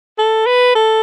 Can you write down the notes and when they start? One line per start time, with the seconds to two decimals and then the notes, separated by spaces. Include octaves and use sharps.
0.18 A4
0.46 B4
0.75 A4